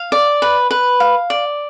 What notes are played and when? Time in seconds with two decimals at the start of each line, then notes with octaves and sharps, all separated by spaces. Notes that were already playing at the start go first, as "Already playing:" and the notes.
Already playing: F5
0.12 D5
0.42 B4
0.71 B4
1.00 F5
1.30 D5